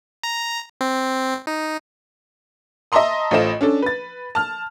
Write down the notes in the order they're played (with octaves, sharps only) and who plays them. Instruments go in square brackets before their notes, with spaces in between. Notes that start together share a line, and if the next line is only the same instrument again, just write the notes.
[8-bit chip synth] A#5
C4
D#4
[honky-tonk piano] D#5 E5 A5 A#5 C6 D#6
A1 F4 A4 C5 D#5 E7
C#4 D4 A4
B4 A6
A5 F6